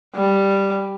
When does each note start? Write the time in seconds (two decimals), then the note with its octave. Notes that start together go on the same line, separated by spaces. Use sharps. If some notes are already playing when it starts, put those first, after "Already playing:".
0.15 G3